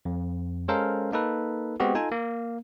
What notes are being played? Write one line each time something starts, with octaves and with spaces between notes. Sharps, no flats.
F2
G#3 C#4 A4 A#4 C5 F5
A#3 D#4 A4 B4
G#3 B3 C4 F#4 G4
D#4 F4 A4 G#5
A#3